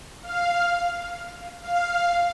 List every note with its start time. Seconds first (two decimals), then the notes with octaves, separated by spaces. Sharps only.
0.22 F5
1.61 F5